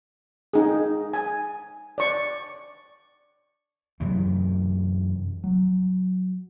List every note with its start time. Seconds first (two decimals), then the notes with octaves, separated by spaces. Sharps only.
0.53 D#4 G#4
1.13 G#5
1.98 D5 C#6
4.00 F#2 C3 E3
5.44 F#3